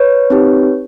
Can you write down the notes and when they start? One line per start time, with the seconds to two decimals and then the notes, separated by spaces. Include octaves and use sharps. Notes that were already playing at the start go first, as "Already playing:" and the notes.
Already playing: B4 C#5
0.30 C4 D#4 G4